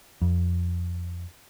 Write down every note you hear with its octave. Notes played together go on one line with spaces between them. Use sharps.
F2